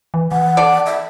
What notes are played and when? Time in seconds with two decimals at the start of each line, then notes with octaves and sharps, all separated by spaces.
0.14 E3
0.32 E3 F#5
0.57 A4 D5
0.86 E5